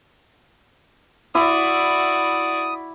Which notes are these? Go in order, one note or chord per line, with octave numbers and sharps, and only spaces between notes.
E4 F#4 D5 D6 D#6